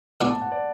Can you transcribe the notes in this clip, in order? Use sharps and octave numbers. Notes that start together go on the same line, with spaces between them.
A2 E3 B3 D4 F#4 D6
A5
F#5
D5